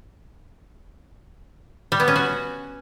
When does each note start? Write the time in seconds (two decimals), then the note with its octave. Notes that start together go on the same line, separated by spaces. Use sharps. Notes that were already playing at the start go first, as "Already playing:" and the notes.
1.92 G3
2.00 B3
2.08 C#4
2.16 F#4